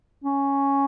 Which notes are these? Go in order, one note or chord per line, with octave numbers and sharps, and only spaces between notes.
C#4